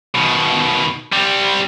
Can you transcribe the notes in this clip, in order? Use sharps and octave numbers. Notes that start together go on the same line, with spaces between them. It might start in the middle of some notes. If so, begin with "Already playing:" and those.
B2 D#3
G3 C4